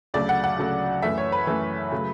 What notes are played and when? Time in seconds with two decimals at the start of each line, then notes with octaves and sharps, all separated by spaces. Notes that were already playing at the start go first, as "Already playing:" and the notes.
0.14 D2 C#3 F#3 A3 D5
0.29 F#5
0.44 F#5
0.58 D2 C#3 F#3 A3
1.02 F#2 E3 A3 E5
1.18 C#5
1.32 B4
1.47 F#2 E3 A3
1.92 C#3 F#3 A3